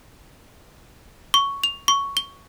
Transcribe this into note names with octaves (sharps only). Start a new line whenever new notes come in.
C#6
F7
C#6
G7